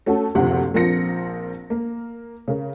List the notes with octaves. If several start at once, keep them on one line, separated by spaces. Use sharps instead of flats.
A3 C#4 F#4 A4
F#1 D2 C3 F3 G4 F#5
A#1 F3 C4 A#4 A#6 C#7
A#3
C#3 A#4